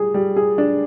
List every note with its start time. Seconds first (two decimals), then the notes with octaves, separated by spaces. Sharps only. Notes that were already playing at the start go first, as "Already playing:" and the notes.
Already playing: G3 G#4
0.14 G3
0.36 G#4
0.58 D4